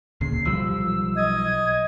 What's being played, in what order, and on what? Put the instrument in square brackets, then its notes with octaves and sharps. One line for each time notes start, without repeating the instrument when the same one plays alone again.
[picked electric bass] D2 A#2 C#3 [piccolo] C7
[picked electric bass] B1 F3 G3 [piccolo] E6
[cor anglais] D#5 [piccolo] G#6